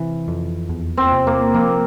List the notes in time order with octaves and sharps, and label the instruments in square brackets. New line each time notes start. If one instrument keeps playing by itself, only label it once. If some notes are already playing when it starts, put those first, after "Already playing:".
Already playing: [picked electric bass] C3 E3
F2
E2
[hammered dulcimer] C4
[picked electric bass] C3
[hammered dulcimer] A#3
[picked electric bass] F3 [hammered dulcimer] A#3